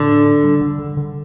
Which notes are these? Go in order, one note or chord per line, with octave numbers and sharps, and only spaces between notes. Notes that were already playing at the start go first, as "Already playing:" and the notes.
Already playing: A2 D3
D4
D4
G3
D3
D3
D3